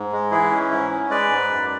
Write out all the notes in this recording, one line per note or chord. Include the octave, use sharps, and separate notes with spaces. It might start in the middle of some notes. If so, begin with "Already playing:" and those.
Already playing: G#2
G#3
E3 E4 G#4
C#4
G#2 E4
C#4
G#3 B4 D5
G#2
F#2